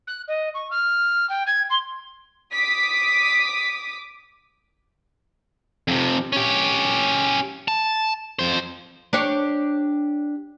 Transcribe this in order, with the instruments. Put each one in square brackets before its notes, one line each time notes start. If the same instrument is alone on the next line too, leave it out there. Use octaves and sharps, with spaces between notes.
[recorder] F#6
D#5
C#6
F6
G5
G#6
C6
[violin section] D6 D#6 B6
[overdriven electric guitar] F2 C3
C#4 G4
A5
F2 C5
[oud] D4 G4 C#5